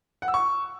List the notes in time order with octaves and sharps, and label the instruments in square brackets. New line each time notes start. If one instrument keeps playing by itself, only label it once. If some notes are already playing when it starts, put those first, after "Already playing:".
[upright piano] F#5
E6
C#6